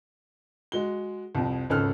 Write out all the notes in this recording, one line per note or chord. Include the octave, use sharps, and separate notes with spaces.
G#3 F#4 G7
C2 F2
G#1 C#2 C#4 A4 F6 F#6